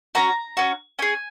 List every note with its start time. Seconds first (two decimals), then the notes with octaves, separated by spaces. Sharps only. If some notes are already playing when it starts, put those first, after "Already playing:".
0.15 C#4 F#4 A#5
0.57 C#4 F#4
0.99 C#4 G#4 G#5